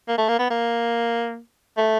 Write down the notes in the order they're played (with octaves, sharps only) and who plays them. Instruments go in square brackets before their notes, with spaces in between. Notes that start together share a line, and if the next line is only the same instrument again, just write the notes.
[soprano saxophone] A#3
A3
A#3
B3
A#3
A3